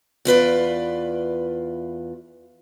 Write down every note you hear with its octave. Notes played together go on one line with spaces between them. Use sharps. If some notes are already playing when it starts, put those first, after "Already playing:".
E2 F4 B4 D5